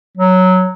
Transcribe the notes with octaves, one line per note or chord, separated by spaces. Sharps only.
F#3